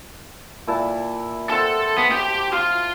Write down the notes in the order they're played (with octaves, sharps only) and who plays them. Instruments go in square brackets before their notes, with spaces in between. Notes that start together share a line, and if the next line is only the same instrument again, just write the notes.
[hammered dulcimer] A#2 E4 A5
[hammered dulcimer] C4 F#5 A5 [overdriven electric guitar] A4
[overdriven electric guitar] B3 [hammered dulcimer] A5
[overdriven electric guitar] G4 G5
F4